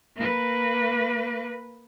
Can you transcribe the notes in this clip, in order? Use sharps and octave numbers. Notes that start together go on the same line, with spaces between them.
A#3 B4